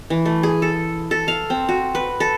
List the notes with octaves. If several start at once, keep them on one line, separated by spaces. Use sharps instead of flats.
E3
A3
G#4
A4
A4
F5
C4
F#4
B4
A4